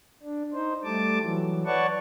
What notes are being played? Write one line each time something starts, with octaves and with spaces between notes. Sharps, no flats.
D4
D#4 C5
G3 A3 A5 D6
E3 F#3
B4 C#5 D5 F#5 A5 C#6